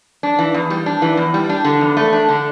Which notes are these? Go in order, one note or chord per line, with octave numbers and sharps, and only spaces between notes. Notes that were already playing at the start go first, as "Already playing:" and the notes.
D4
E3
E2
G3
D4
E3
E2
G3
D4
D3
E2
A3
D4
D3